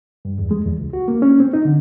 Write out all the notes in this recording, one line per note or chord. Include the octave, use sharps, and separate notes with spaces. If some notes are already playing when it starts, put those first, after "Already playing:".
G2
E2
G#3
E2
C#2
F#4
A#3
C#4
C4
D#4
D3